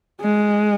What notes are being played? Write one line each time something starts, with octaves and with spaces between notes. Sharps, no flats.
G#3